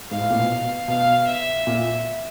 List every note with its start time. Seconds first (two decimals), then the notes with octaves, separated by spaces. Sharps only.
0.10 G#2 F5
0.21 A2
0.30 A#2
0.39 B2
0.88 B2 F5
1.27 E5
1.67 A#2